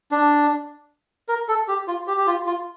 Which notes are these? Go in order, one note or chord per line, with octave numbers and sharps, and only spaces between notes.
D4
A#4
A4
G4
F4
G4
G4
F4
F4